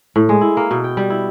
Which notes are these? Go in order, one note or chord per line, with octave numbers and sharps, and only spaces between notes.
A2
G#3
E4
A#3
B2
G5
G3
E4